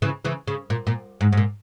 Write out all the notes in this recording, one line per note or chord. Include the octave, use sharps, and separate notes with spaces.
C#3 E3
C#3 E3
C#3
A#2
A#2
G#2
G#2
A#2